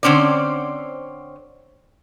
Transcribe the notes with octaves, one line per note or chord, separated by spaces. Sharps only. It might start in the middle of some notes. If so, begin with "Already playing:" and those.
D3 C4 C#4 C5 D5